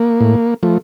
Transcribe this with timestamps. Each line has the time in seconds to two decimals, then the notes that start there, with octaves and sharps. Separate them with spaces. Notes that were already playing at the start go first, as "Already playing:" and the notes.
Already playing: A#3
0.21 A2
0.63 F3 A3